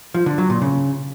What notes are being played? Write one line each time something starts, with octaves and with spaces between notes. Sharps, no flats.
F3
D3
F#3
A#2
C#3